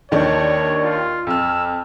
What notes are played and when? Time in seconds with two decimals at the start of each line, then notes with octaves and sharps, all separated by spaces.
0.11 D#2 D#3 D4 C#5
0.84 F4
1.27 F2 E6 F6